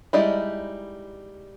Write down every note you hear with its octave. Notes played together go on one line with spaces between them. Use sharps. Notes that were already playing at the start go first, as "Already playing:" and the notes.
G3 G#3 D#4 E4 D5